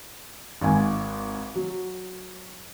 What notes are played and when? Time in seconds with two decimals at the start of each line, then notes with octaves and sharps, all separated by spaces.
0.61 G#1 G#2 G#5
1.55 F#3